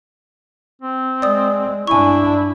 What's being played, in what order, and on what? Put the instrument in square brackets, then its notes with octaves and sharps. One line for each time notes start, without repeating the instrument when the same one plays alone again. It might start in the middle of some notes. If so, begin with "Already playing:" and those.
[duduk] C4
[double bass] G#3 [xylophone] D5 D#6
[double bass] G2 D4 [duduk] E4 [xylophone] G#5 C#6